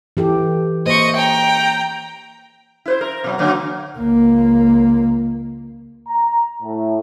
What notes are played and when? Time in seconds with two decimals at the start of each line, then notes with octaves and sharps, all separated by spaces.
0.17 E3 G4 A4
0.86 A#3 C5 D#5 C#6
1.16 G5 A#5
2.86 E4 B4 C5
3.01 A#4
3.24 B2 F#3
3.38 D3 F#3 A#3
3.99 C#2 A#3
6.08 A#5
6.63 A2